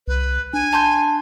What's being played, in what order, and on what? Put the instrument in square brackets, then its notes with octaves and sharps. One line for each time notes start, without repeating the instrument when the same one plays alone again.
[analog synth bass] C2 [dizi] B4
[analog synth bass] D4 [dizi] G#5
[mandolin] A5 C6 G6